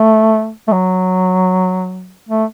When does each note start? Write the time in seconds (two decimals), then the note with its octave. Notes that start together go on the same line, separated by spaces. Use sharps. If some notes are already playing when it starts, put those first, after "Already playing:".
Already playing: A3
0.68 A3
0.72 F#3
2.29 A3